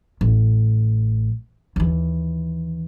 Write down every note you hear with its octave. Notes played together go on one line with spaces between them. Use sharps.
A1
D#2 E3